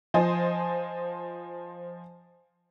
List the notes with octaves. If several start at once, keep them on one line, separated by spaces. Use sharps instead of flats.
F3 C5 D#5 G#5